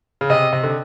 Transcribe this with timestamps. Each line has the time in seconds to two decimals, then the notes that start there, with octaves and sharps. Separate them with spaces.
0.21 C#3
0.30 C3 D#5
0.53 C3
0.63 D3